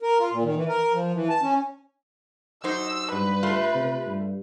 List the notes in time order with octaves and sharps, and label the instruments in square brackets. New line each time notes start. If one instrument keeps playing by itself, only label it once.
[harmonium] A#4
F4
A#2
D#3
E3
A#4
F3
E3
A5
C#4
[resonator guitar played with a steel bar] F#3 D#4 C5 [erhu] E6
[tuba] G2 [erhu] B4
[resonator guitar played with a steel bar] A3 F4
[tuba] C3
G2